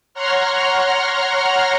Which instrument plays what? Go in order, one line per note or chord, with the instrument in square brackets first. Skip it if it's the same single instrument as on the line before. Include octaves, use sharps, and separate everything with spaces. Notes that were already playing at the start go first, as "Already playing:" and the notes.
[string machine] C#5 F#5 A#5 C6 F6